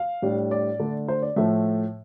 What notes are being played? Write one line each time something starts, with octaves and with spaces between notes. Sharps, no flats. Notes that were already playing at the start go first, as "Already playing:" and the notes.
Already playing: F5
A2 G3 D4
D5
D3 A3 D4
C5
D5
A2 F3 A3 E5